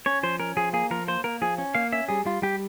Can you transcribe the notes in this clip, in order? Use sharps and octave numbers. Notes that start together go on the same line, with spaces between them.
C#4 C#5
F3 C5
C#4 A#4
F3 G#4
A#3 G#4
F3 A#4
A#3 C5
A#3 A#4
F3 G#4
C#4
A#3 F5
C#4 E5
G3 G#4
G3 F4
G3 G4